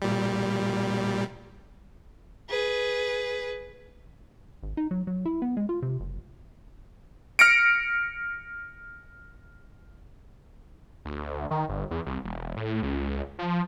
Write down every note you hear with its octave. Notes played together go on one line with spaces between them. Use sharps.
A#2 G3
G#4 B4
G#1
D#4
F#3
F#3
E4
B3
G#3
F4
C3
F#1
F6 A#6 C#7 D7
D2
D#3
G1
E2
C2
E1
A2
C#2
F3